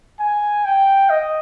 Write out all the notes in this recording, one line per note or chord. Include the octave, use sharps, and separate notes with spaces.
G#5
G5
D#5